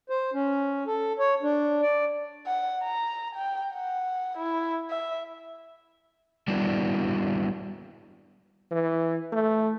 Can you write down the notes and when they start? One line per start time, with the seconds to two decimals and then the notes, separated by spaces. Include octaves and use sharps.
0.10 C5
0.34 C#4
0.87 A4
1.19 C#5
1.43 D4
1.82 D5
2.47 F#5
2.83 A#5
3.36 G5
3.73 F#5
4.38 E4
4.90 E5
6.48 G3 B3 D4 E4 F#4
8.71 E3
9.33 A3